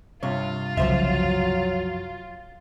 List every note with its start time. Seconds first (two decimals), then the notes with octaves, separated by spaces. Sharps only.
0.23 G2 C3 F4 C#5
0.77 F#1 C2 F#2 F3 F#3 C5 E5